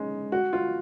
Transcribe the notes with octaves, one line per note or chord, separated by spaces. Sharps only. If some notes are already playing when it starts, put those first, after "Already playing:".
Already playing: G#3 C#4 D#4
F#4
F4